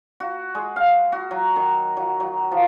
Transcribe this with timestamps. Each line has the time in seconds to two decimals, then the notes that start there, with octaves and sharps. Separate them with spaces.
0.20 F#4
0.55 G#3
0.76 F5
1.12 F#4
1.31 F#3
1.56 D#3
1.97 F#3
2.20 F#3
2.51 F3